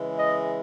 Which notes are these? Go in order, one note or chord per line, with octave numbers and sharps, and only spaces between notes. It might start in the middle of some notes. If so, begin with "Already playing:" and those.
Already playing: C#3 E3 G#3
D#5